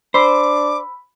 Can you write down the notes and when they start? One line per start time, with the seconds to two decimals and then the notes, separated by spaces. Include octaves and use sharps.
0.14 D4 C5 B5 D6 E6 B6